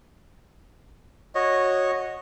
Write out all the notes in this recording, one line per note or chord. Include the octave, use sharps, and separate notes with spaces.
F#4 C#5 D#5